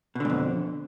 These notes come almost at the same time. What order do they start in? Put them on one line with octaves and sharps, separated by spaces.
B2 D3 G#2 F2